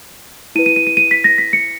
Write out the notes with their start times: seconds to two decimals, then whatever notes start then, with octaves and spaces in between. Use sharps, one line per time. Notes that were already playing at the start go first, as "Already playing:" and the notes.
0.55 E4 D#7
0.59 B4
0.66 D#7
0.76 D#7
0.87 D#7
0.97 D#7
1.11 B6
1.24 A#6
1.38 B6
1.53 C#7